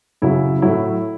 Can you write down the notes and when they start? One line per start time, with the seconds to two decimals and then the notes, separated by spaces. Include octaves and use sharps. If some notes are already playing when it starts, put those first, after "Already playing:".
0.22 F#2 C#3 F#3 E4
0.62 A2 F#3 E4